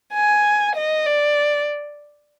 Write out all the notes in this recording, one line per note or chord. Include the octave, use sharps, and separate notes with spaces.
G#5
D#5
D5